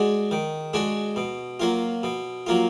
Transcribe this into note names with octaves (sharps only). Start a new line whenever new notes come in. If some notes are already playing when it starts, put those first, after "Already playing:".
Already playing: G#3 D4 F#4
D#3
G#3 D4 F#4
B2
F#3 A#3 F4
B2
F#3 A#3 F4